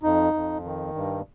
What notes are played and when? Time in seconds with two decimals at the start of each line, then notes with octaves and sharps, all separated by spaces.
0.03 F2 D#4
0.34 F2
0.64 D#3
0.95 G2